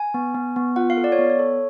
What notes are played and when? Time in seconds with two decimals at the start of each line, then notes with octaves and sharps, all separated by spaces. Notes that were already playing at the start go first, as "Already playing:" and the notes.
Already playing: G#5
0.14 B3
0.35 B3
0.56 B3
0.76 F4 F#5
0.90 F5
0.97 A4
1.04 D5
1.12 C#5
1.19 B3
1.30 C#5
1.39 A4